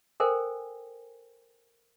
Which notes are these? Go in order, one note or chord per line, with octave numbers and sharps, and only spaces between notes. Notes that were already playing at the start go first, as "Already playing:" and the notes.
A4 A#4 C5 G5 G#5